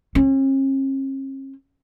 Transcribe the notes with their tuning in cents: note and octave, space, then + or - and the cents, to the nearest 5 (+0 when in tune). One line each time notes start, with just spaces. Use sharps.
C#4 -45